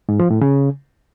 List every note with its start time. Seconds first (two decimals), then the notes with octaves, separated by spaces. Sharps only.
0.09 G#2
0.20 F3
0.30 A2
0.41 C#3